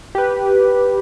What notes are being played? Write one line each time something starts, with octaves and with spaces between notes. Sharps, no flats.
G4 B4